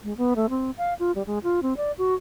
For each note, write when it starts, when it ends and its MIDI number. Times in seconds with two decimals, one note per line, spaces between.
0.04 0.15 56
0.17 0.34 59
0.36 0.49 57
0.50 0.71 60
0.77 0.94 77
0.99 1.12 65
1.15 1.22 55
1.26 1.39 56
1.43 1.60 65
1.62 1.74 60
1.77 1.92 74
1.98 2.14 66